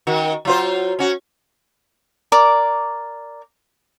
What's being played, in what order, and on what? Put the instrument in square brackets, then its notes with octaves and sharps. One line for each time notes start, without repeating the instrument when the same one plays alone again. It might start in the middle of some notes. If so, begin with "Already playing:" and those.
[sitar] D#3 F#4
F#3 F4 C5
C#4 F#4
[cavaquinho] A#4 D5 D6